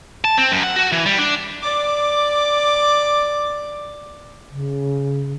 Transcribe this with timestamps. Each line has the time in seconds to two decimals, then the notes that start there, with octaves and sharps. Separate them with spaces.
0.25 A5
0.37 C4
0.52 F#2
0.63 F#5
0.76 F#4
0.92 E3
1.06 G3
1.19 D4
1.62 D5 D6
4.51 C#3